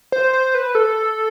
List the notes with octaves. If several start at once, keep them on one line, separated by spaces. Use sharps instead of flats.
C5
C5
B4
A4